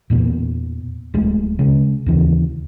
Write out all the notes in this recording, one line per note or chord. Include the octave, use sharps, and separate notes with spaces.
E2 A#2 B3
D1 G#3 A3
C#3 G#3
D#2 C#3 E3